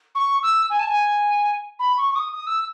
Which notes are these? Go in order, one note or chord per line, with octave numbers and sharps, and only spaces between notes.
C#6
E6
G#5
A5
G#5
B5
C#6
C#6
D#6
D#6
E6